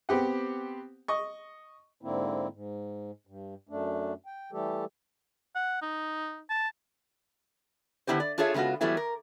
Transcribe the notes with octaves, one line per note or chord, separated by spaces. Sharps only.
B3 C4 G4 F#5
D#5 C#6
G#2 D3 A#3 C4 E4
G#2
G2
F#2 A3 D4
G5
E3 G3 A3 G4 A4
F#5
D#4
A5
D3 B3 E4 G4 C5
D5
D4 F4 G#4 A4 C#5 E5
C#3 G#3 B3 F4 F#4
E3 F#3 G3 A3 B3 E4
A#4